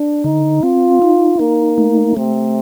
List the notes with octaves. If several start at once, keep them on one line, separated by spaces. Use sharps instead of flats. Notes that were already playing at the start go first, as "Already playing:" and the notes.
Already playing: D4
D3 D#4
C4 F4
D#4
A#3 D#4
A3
C3 A3